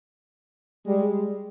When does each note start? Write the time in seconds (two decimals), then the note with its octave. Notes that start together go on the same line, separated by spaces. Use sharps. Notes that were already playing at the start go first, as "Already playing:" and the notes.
0.86 G3 G#3